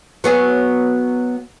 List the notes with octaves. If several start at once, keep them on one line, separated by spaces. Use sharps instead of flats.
F#3 B3 G#4